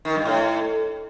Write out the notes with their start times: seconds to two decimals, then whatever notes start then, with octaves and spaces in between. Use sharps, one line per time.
0.05 D#3
0.15 G2
0.25 A2